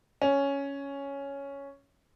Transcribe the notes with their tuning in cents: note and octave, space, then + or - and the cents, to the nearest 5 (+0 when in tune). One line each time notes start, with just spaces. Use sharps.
C#4 +5